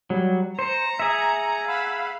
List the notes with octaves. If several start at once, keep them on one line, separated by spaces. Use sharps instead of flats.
F#3 G3
C5 A#5 C#7
G#4 E5
F5 F#5 B5 E6